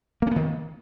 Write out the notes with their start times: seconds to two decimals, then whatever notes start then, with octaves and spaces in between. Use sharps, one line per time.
0.22 A#3
0.27 C#4
0.31 B3
0.36 D#3